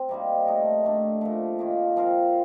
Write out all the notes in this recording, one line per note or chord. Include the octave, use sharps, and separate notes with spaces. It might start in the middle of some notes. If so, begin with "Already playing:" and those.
Already playing: C4
C3 G3 A#3 D#4
A3 D#4 A#4
A2 A3 D4
A#2 F3 A3
D#3 A#3 F4
F3 C4 F4 A#4